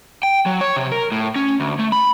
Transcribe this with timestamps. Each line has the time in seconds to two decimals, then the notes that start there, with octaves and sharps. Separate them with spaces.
0.23 G5
0.46 F#3
0.61 C#5
0.76 C3
0.92 A#4
1.12 A2
1.36 C#4
1.60 D2
1.79 A3
1.92 B5